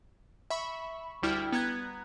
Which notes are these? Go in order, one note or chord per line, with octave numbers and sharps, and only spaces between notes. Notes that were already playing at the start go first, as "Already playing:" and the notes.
E5 B5 C#6
D2 G3 E4 G5 F6
B3 A#5 F#6 G#6